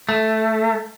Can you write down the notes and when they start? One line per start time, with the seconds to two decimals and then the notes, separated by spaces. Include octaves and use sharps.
0.09 A3